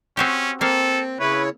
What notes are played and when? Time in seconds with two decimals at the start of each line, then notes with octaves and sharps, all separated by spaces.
0.17 C4 C#4 F#4 G4
0.61 A#3 C4 A4 F5
1.20 C#3 E4 B4 C#5